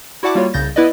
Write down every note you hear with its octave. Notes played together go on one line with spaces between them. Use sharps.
E4 F#4 D5 F#5 A5 D6
G3 A#3 F4 F#4 C#5
C2 C#3 G6 A6 A#6
B3 E4 B4 D5 D#5